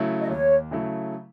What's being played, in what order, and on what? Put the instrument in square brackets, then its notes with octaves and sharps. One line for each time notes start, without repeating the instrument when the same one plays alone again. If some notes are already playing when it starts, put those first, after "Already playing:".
Already playing: [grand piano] C#3 F#3 A3 E4
[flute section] D#5
[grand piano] D#2 [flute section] C#5
[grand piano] C#3 F#3 A3 E4